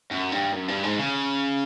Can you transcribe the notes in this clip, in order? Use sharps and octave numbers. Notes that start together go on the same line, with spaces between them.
F#2
G2
F#2
G2
G#2
C#3